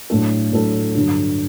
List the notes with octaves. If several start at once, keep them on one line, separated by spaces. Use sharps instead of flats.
A2 F#3 A3 D4 A4
A2 F#3 A3 D4 A4
G2 D3 F#3